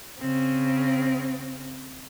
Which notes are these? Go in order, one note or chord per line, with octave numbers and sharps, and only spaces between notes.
C#3 C4